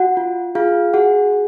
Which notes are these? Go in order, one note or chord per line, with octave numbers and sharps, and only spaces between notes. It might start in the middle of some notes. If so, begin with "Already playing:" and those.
Already playing: F#4 F#5
F4
F4 G#4 F5
F#4 G#4 F#5
F#4